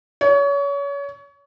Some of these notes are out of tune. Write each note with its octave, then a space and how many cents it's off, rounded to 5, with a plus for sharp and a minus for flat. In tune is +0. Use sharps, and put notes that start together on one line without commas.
C#5 +30